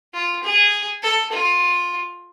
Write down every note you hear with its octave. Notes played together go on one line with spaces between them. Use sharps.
F4
G#4
A4
F4